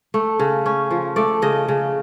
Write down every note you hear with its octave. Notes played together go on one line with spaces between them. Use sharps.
A3
C#3
C#4
F3
A3 D5
C#3 D#5
C#3